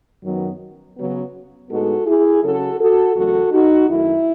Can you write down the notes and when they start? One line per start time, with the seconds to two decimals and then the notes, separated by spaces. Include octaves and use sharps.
0.24 F#2 D#3 F#3 B3
0.97 C#3 F#3 B3
1.69 A2 G#3 B3 D#4 F#4 A4
2.06 E4 G#4
2.43 C#3 F#3 C#4 F#4 A4
2.79 F#4 A4
3.16 E2 C#3 F#3 A3 F#4 A4
3.52 D#4 F#4
3.89 F#2 D#3 A3 E4